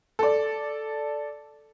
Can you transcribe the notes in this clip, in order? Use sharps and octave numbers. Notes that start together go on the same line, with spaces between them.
A4 D5